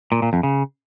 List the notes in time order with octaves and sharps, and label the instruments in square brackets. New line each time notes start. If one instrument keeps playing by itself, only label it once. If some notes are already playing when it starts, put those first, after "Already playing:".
[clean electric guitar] A#2
A#2
F2
C#3